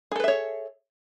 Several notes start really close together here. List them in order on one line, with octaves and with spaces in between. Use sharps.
G#4 A4 B4 E5 C#5